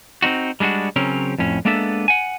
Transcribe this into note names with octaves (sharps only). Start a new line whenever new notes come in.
C4 C#4 D#4 F#4
G3 G#3 D4 F4 F#4
C#3 F#3 C4 C#4 A#4
F2 A2 C#4
G#3 A#3 B3 D4 A4 E5
F#5 G#5